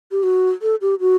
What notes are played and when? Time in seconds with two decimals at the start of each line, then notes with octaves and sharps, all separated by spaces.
0.11 G4
0.23 F#4
0.62 A4
0.81 G4
1.00 F#4